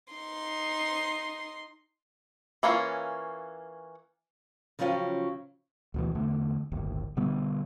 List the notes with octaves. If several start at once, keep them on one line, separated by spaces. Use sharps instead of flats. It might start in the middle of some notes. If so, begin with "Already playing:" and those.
D#4 C6
E3 A#3 C#4 F4
C#3 F3 F#3 C#4 F4 G5
D2 B2 E3
E2 D3 A3
D1 G1 D#2
B2 D3 G3 B3